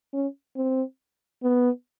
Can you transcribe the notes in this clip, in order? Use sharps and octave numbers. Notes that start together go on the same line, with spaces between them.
C#4
C4
B3